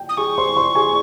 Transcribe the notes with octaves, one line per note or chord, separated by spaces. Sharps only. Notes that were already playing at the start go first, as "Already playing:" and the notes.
Already playing: G5
D#6
G#4 G#5 C#6
C5 C6
C5 C6
G#4 G#5